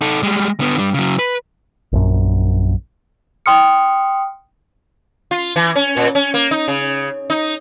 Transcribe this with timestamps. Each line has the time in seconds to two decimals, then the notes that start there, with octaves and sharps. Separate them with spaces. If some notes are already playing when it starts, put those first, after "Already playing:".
0.01 D#4 A4
0.23 G3 G#3
0.60 D3 B3
0.78 G3 D4
0.95 C#3 F#3
1.19 B4
1.93 A#1 F#2
3.46 G5 C6 D#6 F6 C#7
5.31 F4
5.56 E3
5.76 C#4
5.97 A#2
6.15 C#4
6.34 A#3
6.51 D#4
6.68 C#3
7.30 D#4